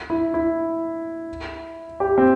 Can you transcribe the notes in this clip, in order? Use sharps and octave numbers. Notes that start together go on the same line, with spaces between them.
E4
E4
G4
C4